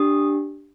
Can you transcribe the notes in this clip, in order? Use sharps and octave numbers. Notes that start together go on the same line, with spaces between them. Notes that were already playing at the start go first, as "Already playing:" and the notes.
Already playing: D4 G4 D#6